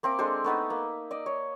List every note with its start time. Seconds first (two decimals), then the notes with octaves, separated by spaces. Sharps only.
0.03 A#3 C4 E5 D6
0.19 G#3 D4 A4 C5
0.44 A3 B3 D#4 E5
0.70 A#3
1.11 D5 D#5
1.26 C#5